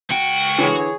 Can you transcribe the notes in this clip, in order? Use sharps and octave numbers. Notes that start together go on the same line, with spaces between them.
C#2 F#4 G5
D3 E3 G#4 C#5